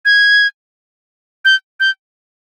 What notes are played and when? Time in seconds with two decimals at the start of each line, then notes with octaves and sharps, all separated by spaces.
0.05 G#6
1.45 G6
1.80 G6